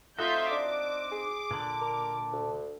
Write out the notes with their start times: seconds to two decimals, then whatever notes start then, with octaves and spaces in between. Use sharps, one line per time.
0.19 A3 C4 D#4 F4 F#4 E5 G6
0.51 D4 D6
1.11 G#4
1.51 A#2 D3
1.81 A#4
2.32 D2